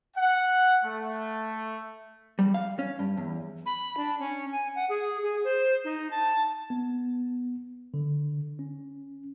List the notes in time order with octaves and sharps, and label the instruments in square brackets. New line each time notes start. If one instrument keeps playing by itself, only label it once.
[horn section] F#5
A3
[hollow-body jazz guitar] G3
F5
C#4
G2
E2
[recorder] B5
D4
C#4
G#5
F#5
G#4
G#4
C5
D#4
A5
[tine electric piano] B3
D3
C#4